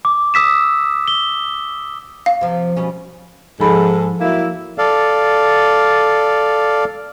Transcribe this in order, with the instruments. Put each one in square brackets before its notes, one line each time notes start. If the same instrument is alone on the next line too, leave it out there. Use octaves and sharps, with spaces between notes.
[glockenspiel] D6
D#6 E6 B6 E7
G7
[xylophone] F5
[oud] C3 F3
B2 G3 C#4
[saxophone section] G#2 A4 [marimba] F3 B5
[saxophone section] F#3 A#3 E4
[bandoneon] A4 D5 F5